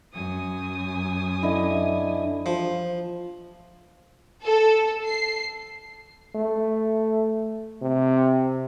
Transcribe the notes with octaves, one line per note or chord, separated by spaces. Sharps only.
F#2 G#5 D#6
D3 E4 D#5
F3
A4
C7
A3
C3